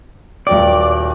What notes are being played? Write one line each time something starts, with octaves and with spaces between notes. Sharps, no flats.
D#1 F#3 D5 G5